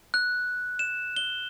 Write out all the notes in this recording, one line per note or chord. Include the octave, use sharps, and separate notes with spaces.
F#6
E7
G7